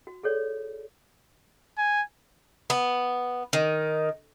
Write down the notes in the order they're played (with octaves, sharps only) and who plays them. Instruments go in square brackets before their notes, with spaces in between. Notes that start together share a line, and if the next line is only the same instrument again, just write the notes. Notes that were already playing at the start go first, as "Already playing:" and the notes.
[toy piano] F#4
G#4 A4 C#5 D5
[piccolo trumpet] G#5
[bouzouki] B3
D#3